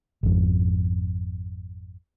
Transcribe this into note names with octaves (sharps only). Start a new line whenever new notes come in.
G#1 F2